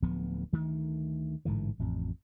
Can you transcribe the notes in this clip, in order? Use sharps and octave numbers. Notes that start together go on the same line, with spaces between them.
D1 D2 F3 B3
D2 D#3 A3
A1 G#2 D3 E3
A1 F2